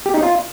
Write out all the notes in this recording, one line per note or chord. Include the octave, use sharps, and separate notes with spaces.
G4
D#4
F4